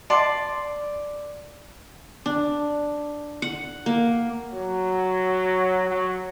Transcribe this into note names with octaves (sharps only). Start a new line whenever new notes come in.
D5 A5 C6
D4
F#5
A#3
F#3
F#3